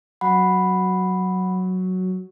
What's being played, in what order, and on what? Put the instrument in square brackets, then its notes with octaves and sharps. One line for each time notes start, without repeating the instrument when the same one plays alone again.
[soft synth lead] F#3 [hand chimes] F#5 B5